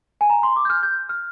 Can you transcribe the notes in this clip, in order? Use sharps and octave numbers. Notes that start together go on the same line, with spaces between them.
G#5
A#5
C6
D6
G6
F6
G6
F6